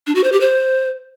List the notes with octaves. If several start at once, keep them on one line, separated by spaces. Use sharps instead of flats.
D4
F#4
C5
G4
C5